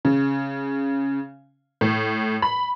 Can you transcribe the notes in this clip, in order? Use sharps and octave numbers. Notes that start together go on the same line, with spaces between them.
C#3
A2
B5